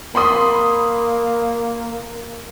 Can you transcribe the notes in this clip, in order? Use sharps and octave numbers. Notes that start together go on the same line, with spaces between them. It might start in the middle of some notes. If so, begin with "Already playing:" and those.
A#3 B5 C6 D#6